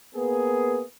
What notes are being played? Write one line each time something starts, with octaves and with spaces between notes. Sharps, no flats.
A#3 B3 G#4